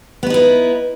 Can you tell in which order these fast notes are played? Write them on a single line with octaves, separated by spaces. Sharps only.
B3 B4 D#4 E4